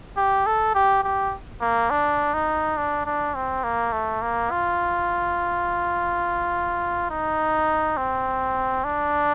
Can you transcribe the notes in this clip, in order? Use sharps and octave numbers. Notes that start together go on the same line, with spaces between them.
G4
A4
G4
G4
A#3
D4
D#4
D4
D4
C4
A#3
A3
A#3
F4
D#4
C4
D4